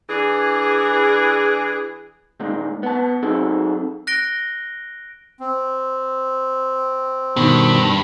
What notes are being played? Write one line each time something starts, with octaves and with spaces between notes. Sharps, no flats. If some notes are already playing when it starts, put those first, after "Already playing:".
E3 D4 G#4
A#2 D#3 G#3
B3 A5
F#3 C4 D#4 G#4 A4
F#6 A#6 D7 G7
C4
G2 B2 D#3